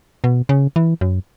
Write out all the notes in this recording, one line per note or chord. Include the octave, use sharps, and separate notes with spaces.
B2
C#3
E3
F#2